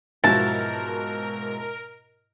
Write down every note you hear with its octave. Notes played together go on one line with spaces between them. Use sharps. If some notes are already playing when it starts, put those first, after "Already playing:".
G#2 B2 F3 F#3 E4 F#4 A#4 A5